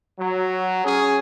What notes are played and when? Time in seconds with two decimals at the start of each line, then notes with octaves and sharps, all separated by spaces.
0.19 F#3
0.85 C#4 G#4